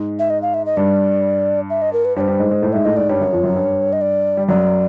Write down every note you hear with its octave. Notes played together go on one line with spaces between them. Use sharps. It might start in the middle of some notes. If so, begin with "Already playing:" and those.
Already playing: G#2 G#3
E5
D#5
F5
E5
D#5
G2 G3 D5
E5
D#5
A#4
B4
G2 G3 C#5
C5
G2 G3
G#2 G#3
G#2 G#3
A2 A3
G#2 G#3 E5
A2 A3 D#5
G#2 G#3 D5
G2 G3 C#5
F#2 F#3
F2 F3
F#2 F#3
G2 G3
D#5
D5
G3
F#2 F#3 D5